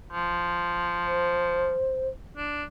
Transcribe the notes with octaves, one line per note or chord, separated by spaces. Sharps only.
F3
C5
D4